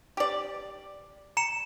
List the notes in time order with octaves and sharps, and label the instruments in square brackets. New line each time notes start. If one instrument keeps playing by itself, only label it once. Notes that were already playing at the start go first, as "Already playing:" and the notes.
[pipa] G4 D5
[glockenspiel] A#5 C#7 E7